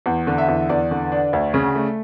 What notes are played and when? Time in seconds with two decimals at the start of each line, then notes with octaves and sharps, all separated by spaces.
0.06 E2
0.27 D3
0.38 E5
0.48 E2
0.69 E2 D5
0.91 D3
1.12 D4
1.33 D2
1.54 C#3
1.75 A3